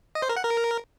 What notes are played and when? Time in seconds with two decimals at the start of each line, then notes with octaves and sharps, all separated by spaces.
0.15 D#5
0.22 C5
0.29 A#4
0.36 F#5
0.44 A#4